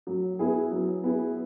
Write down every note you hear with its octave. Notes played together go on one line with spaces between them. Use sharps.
F#3
B3 E4 G#4
F#3
B3 E4 G#4